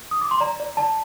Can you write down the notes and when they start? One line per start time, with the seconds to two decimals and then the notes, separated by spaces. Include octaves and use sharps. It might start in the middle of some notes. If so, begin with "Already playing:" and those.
0.11 D#6
0.21 D6
0.31 C6
0.40 D5 A#5
0.60 D5
0.77 D5 A5